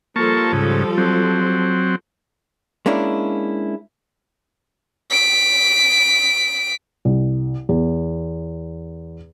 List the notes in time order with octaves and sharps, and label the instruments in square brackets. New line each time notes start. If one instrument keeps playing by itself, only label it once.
[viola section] F3 G3 A4 [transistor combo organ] A#3 A5 C#6
[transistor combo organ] G#2 C#3
F#3 C4
[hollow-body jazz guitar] G#3 A#3 C#4 D4 E4
[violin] B6 D7
[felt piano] C2
E2